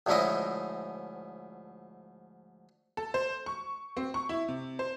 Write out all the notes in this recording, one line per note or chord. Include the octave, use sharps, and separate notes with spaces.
D2 G#2 F3 C#4 E4 D#5
A4
C5
C#6
C4
C#6
E4
C3
C5